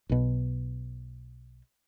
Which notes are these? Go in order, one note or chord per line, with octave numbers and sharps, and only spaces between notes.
B1 B2